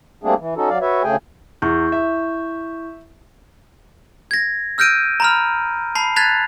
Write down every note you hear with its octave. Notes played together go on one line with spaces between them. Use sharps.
G3 A3 A#3 C4 D4 G#4
E3
C#4 D#4 F#4 A4
F#3 D5 F5
F#4 B4 C#5 E5
D2 C#3 A3 G#4 G5 G#5
E2 E4 C#6 G6
E5
G#6 A#6
E6 F6 G6 A#6 D7 D#7
A#5 B5 F6
A5 B5 C7
A5 F#6 G#6 A6 B6 F7